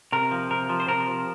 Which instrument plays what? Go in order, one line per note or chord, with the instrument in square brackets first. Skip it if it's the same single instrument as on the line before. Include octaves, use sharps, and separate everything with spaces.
[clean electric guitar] C3 A#4
F3
C3 A#4
F3
C5
C3 A#4
F3